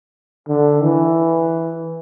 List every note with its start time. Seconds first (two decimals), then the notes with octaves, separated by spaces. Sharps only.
0.48 D3
0.83 E3